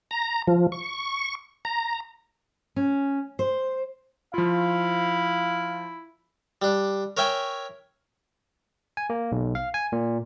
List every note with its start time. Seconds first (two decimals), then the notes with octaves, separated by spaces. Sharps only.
0.11 A#5
0.47 F3
0.72 C#6
1.65 A#5
2.76 C#4
3.39 C5
4.34 F3 E4 F4 F5
6.62 G3 D4
7.17 A#4 C#5 E5 G5 G#5
8.97 G#5
9.10 A#3
9.32 B1
9.55 F5
9.74 G#5
9.92 A#2